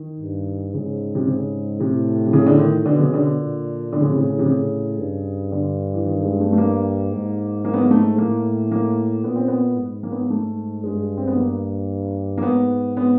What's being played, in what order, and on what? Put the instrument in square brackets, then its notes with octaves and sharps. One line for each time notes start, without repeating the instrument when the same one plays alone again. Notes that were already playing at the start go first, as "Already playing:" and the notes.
Already playing: [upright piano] D#3
[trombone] G2
[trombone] G#2 [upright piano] C#3
[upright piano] C3
C#3
[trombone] A2 [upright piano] C3
[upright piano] C3
C#3
D3
D#3
[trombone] B2 [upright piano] D3
[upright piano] C#3
D3
[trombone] A#2
[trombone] A2 [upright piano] D3
[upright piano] C#3
C3
C#3
C3
C#3
[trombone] G2
[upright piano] D3
E3
D#3
G#3
A3
A3
A#3
[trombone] G#2
[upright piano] A#3
B3
A#3
A3
[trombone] A2 [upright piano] A#3
[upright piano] A#3
[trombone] A#2 [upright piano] B3
[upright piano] C4
B3
[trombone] G#2
[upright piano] A#3
B3
A#3
A3
[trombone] G2 [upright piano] G#3
[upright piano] C4
B3
A#3
A#3
[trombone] G#2 [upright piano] B3
[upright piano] B3